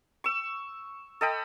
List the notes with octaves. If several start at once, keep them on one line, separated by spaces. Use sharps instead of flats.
C#6 E6
A4 D#5 G5 B5